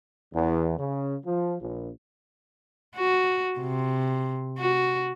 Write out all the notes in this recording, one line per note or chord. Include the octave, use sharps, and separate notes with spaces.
E2
C#3
F3
A#1
F#4
C3
F#4